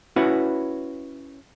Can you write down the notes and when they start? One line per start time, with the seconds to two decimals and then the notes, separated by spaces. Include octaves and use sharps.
0.16 C#4 E4 F#4 B4